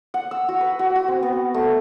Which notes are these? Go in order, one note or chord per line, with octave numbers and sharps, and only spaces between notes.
F#5
E6
F#4
B4
F#4
F#4
C4
B3
A3